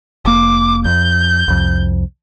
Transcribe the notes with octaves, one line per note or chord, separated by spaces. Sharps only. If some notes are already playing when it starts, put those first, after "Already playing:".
F1 A#3 D6
F2 G6
C2 F2